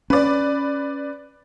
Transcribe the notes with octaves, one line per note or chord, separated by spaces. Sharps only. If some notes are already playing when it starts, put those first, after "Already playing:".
C#4 B4 D5